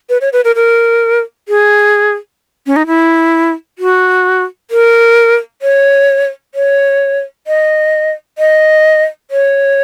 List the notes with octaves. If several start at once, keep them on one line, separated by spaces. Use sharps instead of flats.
B4
C#5
B4
A#4
A#4
G#4
C#4
D#4
E4
F#4
A#4
C#5
C#5
D#5
D#5
C#5